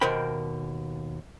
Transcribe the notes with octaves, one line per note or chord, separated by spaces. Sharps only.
D#2 B2 A#4 C5 G5 B5